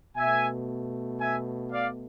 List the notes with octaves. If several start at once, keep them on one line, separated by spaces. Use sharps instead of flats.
B2 A3 E5 G#5
E5 G#5
D5 F5